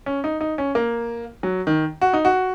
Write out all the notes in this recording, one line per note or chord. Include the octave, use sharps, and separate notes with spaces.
C#4
D#4
D#4
C#4
A#3
F#3
D#3
F#4
D#4
F#4